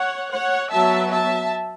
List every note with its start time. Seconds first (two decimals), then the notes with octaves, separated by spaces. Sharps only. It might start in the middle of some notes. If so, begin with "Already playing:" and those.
Already playing: C#5 F#5
0.32 C#5 F#5
0.72 F#3 B3 E5 A5
1.12 E5 A5